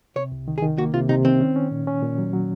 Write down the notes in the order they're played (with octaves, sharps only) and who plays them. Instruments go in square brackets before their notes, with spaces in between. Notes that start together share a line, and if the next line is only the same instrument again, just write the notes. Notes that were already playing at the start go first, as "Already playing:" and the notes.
[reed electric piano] C3 [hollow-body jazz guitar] C#5
[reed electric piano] C2
D#3
[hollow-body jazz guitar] G#4
[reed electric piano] D#3
[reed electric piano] A#3 [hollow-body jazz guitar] F#4
[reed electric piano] C3 [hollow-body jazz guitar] F4
[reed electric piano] C3 [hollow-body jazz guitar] D#4
[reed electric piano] D#3 [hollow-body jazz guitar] C4
[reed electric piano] C#4
C#4
A#2
C#4
A#2
F#3
F#3